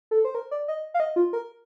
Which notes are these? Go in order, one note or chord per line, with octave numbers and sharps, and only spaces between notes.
A4
C5
A#4
D5
D#5
F5
D#5
F4
A#4